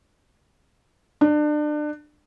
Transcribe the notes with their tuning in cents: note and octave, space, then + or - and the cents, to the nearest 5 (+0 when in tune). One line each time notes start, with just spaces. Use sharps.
D4 +30